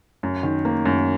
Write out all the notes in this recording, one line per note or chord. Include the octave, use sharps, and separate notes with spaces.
F#2
D#3
A#3
F#2